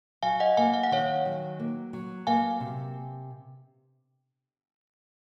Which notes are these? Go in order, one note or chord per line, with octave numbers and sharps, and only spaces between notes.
F#3 F5 G#5
D#5 F#5
A#3 F5 G#5
F5
F#5
D#3 C#5 F5
F#3
A#3
F#3
A#3 F5 G#5
C3